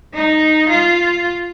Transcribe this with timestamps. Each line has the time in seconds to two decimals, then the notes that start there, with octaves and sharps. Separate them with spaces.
0.14 D#4
0.69 F4